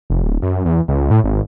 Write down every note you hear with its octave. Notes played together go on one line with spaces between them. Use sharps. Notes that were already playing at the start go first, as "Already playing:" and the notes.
F1
D1
F#2
E2
C#2
A2
G#1